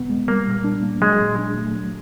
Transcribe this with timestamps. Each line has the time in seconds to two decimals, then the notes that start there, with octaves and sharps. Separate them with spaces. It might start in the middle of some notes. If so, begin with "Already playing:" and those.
Already playing: E2 B2 B3
0.09 G#3
0.28 G3 A#3
0.46 A#2
0.64 D4
0.83 A#3
1.01 F#3 G#3
1.20 A#2
1.38 D4
1.58 A3
1.75 F#3